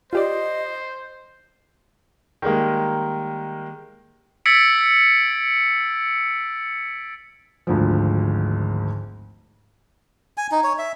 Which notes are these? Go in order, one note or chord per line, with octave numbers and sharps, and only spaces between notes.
F4 G4 C5 D5 D#5
D#3 G3 G#3 A#3
E6 G#6 A6 B6 C#7 D7
G#1 D2 F3
G#5
D#4
C#5
E5